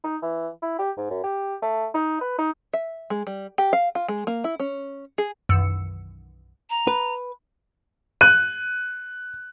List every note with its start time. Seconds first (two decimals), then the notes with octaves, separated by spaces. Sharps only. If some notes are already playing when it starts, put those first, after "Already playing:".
0.04 D#4
0.22 E3
0.62 E4
0.79 G4
0.97 G#2
1.10 F#2
1.24 G4
1.62 A3
1.94 D#4
2.21 B4
2.39 D#4
2.73 E5
3.10 G#3
3.27 G3
3.58 G4
3.73 F5
3.95 F4
4.08 G#3
4.27 A#3
4.44 E4
4.60 C#4
5.18 G#4
5.49 B1 F#2 D#3 E3 E6 C#7
6.70 A#5
6.87 B4
8.21 F#6 D#7